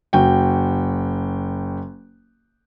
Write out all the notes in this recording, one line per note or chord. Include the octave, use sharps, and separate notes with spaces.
F#1 F#4 G5